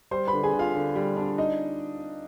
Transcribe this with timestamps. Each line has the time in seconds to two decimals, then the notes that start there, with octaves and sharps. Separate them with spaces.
0.11 G3 C5 C6
0.27 B4 B5
0.33 D3
0.43 G#4 G#5
0.53 D3
0.59 F4 F5
0.75 D3
0.95 G3
1.17 D4
1.38 D#4 D#5